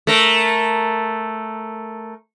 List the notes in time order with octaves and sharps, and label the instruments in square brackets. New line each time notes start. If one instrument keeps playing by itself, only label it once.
[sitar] A3 A#4